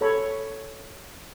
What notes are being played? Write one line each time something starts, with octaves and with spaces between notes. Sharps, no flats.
A4 C#5 B5